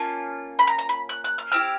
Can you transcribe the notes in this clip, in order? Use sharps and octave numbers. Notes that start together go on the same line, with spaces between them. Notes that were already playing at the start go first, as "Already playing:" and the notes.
Already playing: A#3 C#4 F4 A5
B5
A#5
A#5
B5
F#6
F#6
F6
C4 E4 G4 F6